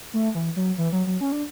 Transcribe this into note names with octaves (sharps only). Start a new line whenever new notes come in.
A3
E3
F#3
E3
F#3
F#3
C#4
D4